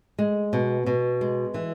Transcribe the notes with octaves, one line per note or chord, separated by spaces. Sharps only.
G#3
B2
B2
G#3
E3